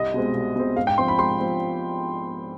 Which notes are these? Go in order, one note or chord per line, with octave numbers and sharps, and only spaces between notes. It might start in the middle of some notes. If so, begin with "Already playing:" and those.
Already playing: C2 D#5
B2 G#3 C4
C2
B2 G#3 C4
G#2 F5
G5
F3 C4 C6
B5
G#2 C6
F3 C4